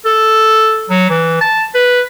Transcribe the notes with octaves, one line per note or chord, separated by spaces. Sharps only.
A4
F#3
E3
A5
B4